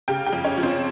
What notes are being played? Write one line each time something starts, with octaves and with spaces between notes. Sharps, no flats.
C#3 G4 G5
G4 G5
F2
C#4 C#5
F3
C4 C5